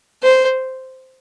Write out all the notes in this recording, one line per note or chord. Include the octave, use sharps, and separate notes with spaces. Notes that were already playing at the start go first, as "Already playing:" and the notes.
C5